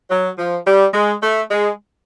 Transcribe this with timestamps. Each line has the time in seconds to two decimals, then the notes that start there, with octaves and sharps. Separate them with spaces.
0.10 F#3
0.38 F3
0.66 G3
0.94 G#3
1.22 A3
1.50 G#3